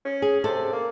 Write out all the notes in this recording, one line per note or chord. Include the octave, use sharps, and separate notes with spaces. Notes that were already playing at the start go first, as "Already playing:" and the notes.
C#4
G#4
C3 A4 D5
A#3